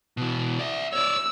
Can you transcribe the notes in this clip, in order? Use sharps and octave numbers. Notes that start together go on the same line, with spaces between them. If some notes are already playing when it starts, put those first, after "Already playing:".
B2 E3
D5 E5
C#5 D5 E6